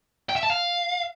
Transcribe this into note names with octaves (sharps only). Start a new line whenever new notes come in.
G5
E5
A5
F5